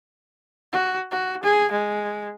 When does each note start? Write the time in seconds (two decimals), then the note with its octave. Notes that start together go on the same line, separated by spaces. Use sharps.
0.72 F#4
1.11 F#4
1.43 G#4
1.71 G#3